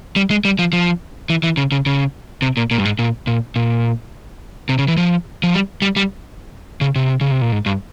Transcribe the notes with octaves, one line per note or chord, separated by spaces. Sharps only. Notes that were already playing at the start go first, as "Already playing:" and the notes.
G3
G#3
G3
F3
F3
E3
E3
C#3
C#3
C#3
C3
A#2
A#2
G2
G#2
A#2
A#2
A#2
C3
C#3
E3
F3
F3
G3
G3
G3
C#3
C3
C#3
C3
A#2
G#2
G2